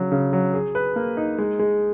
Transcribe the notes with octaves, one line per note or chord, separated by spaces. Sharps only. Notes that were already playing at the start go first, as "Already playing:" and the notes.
Already playing: C#3 F#3
C#3
F#3
G#4
B4
A#3
D#4
G#3
G#3